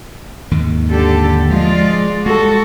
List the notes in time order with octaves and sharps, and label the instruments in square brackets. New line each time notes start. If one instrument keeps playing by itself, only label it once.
[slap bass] D#2 G#2 D#3
[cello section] D3 G4 A4
[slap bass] F3 [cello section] G#3 F4 D5
[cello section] G3 F#4 A4 [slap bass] G#3